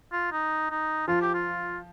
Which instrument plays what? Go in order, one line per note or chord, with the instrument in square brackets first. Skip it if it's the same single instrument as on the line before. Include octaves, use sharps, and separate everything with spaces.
[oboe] F4
D#4
D#4
[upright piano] F3 [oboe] F4
[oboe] G4
F4